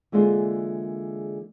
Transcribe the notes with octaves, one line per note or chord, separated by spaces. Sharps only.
D3 E3 G#3 A#3 F4 G#4